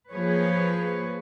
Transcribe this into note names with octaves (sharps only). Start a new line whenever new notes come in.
F3 A#3 G#4 B4 C#5